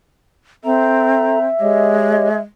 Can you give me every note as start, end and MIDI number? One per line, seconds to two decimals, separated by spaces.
0.64 1.46 60
0.64 1.39 69
0.64 2.41 76
0.64 1.39 82
1.60 2.38 56
1.60 2.29 67
1.60 2.29 73
1.60 2.29 75